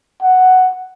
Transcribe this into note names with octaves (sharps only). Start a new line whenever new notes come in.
F#5